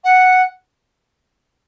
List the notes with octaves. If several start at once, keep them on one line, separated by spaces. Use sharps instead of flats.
F#5